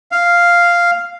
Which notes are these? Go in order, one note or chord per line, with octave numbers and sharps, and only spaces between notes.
F5